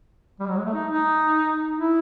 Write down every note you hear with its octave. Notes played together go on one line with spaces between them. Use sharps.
G3
F#3
G#3
A3
D#4
D#4
E4